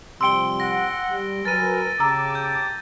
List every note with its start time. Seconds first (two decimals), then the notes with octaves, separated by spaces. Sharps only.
0.21 C3 F3 G3 G5 C6 E6 D7 G7
0.60 F#5 A#6
1.10 G3
1.45 F#3 A#4 B4 G#5 A6 D#7
2.00 C#3 G4 A5 A#5 D6 E6
2.35 G6